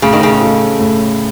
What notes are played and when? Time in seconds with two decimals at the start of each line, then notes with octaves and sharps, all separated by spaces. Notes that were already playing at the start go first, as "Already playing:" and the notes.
0.02 A2 C#3
0.13 D#3
0.23 C#3
0.41 A3
0.80 A2